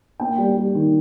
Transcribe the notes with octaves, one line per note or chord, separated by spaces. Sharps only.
A#3 G5
G3
G3
D#3